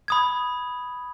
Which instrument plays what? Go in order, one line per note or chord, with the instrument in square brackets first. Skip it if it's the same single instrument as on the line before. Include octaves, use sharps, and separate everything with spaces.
[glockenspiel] B5 D#6 G#6